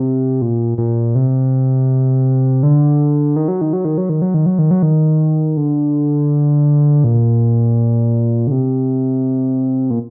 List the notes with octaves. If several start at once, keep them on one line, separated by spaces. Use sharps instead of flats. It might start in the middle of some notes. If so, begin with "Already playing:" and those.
Already playing: C3
A#2
A#2
C3
D3
D#3
F#3
D#3
F#3
D#3
F#3
D#3
F#3
D#3
F#3
D#3
F#3
D#3
D3
A#2
D3
C3
A#2